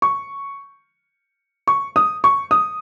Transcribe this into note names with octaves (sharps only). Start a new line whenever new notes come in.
C#6
C#6
D#6
C#6
D#6